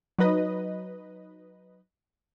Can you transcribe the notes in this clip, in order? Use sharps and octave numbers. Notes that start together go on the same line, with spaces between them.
F#3 D#4 B4 D#5